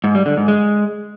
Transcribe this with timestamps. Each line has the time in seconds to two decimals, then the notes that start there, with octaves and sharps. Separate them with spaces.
0.04 G#2
0.15 G3
0.26 D3
0.37 G#2
0.48 G#3